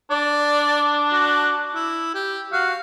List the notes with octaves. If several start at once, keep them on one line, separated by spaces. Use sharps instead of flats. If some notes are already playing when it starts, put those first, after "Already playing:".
D4 D5
F#4
E4
G4
F#4 F5